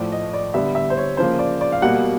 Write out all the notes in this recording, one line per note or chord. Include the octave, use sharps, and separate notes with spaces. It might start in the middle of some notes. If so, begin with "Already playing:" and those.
Already playing: A2 F3 A3 D5
D#5
D5
D3 G3 B3 E5
E5
C5
C#5
C#3 F3 A#3 C5
D5
D5
F5
B2 G3 A#3 F#5